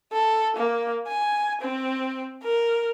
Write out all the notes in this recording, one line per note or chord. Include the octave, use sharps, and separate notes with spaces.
A4
A#3
G#5
C4
A#4